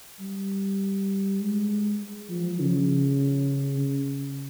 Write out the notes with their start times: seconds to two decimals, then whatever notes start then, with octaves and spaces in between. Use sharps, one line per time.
0.20 G3
1.40 G#3
2.30 F3
2.60 C#3
3.79 C#3